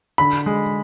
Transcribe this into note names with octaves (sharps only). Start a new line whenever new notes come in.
D3 B5
G#3